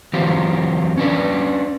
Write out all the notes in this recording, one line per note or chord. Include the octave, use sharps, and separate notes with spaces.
E3 F#3 C4 F4 G4
C#4 D4 B4 D5